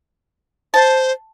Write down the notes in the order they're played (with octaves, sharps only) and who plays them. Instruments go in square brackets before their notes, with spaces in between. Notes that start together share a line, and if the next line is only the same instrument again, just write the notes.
[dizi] C5 [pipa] A5